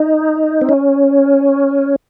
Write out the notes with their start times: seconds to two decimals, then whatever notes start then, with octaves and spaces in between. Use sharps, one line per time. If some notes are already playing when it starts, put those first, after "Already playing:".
Already playing: D#4
0.61 C4
0.69 C#4